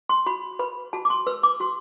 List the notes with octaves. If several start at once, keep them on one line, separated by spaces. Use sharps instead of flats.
C6
F#4 B5
B4 B5
F#4 A5
D6
C6
B4 E6
D6
F#4 C6